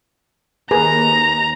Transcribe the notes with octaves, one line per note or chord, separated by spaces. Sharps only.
D#2 G#4 A#4 B4 A#5